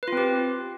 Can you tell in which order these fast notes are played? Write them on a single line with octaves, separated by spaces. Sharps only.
B4 F4 C4 G4